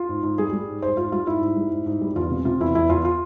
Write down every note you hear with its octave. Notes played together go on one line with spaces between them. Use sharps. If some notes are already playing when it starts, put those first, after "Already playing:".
Already playing: F4
G#2
G#2
G3 G#4
G3
G#2
G#2 C5
G#2 F4
G3 F4
G#2 E4
G#2
G3
G#2
G#2
G3
E2 F4
C3
C3 F4
E2 E4
E2 E4
E2 F4
F4